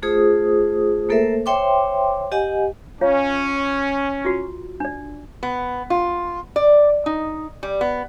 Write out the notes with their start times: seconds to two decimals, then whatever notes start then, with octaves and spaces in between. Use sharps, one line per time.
0.03 A3 F4 G#4 C5 D#6
1.09 A3 A#3 A4 A#4 C5 E5
1.46 C5 C#5 E5 G5 C6 D6
2.32 G4 D#5 F#5 G#5
3.01 C#4 F4 C#5 F5
4.25 F4 F#4
4.80 D4 D5
5.43 B3
5.90 F4
6.56 D5
7.06 D#4
7.63 G3
7.81 B3